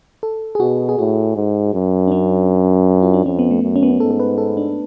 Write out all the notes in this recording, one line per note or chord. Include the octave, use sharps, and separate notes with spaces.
A4
G#4
B2 F#4
G#4
A2 F#4
G#2
F#2
D4
C#4
F4
D4
F2 C#4
B3
A3
F#2
C#4
B3
C#4
G#2 A4
A4
B4
A4
D4